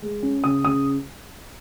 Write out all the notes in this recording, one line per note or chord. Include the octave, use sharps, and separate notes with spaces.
G#3
C#4
C#3 D#6
C#3 D#6